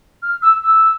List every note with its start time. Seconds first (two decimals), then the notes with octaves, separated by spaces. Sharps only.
0.22 F6
0.42 E6
0.64 E6